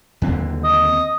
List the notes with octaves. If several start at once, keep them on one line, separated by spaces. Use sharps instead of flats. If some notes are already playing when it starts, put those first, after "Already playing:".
D#2 D3 C4
D#5